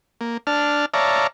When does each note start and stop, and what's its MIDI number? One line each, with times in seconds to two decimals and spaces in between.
0.21 0.37 58
0.47 0.86 62
0.47 0.86 81
0.47 0.86 89
0.94 1.27 73
0.94 1.27 74
0.94 1.27 76
0.94 1.27 77
0.94 1.27 81
0.94 1.27 82